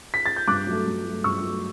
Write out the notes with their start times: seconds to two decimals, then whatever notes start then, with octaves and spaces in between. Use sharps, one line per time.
0.14 B6
0.26 A6
0.36 G6
0.48 G2 D6 F#6
0.67 F#3 A3
0.86 G2
1.05 F#3 A3
1.24 G2 C#6 E6
1.42 F#3 A3